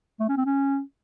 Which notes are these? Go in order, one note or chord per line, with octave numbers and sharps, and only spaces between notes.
A3
C#4
C4
C#4